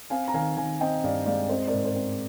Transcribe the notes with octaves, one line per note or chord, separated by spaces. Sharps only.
C4 F5 G#5
A#5
D#3 F5 G#5
D#3 F5 G#5
C4 D#5 G5
G2 D5 F5
G#3 D5 F5
C4 C5 D#5
A#4 D5
G#2
C5
C4